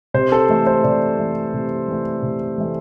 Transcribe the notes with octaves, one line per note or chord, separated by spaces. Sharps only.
C3 C5
A4
E3 A3
C5
C3 D5
E3 A3
C3
E3 A3
C3
E3 A3